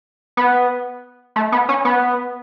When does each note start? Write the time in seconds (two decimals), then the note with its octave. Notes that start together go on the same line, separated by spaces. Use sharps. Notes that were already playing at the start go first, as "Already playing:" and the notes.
0.37 B3
1.36 A3
1.52 B3
1.69 C#4
1.85 B3